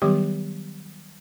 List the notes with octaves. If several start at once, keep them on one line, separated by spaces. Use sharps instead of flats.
D#3 F#3 G3 B3 G4 D6